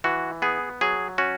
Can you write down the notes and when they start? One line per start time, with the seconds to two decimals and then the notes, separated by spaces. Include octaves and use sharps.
0.04 E3 F#4
0.42 B3 G#4
0.81 F#3 G#4
1.18 C#4 F#4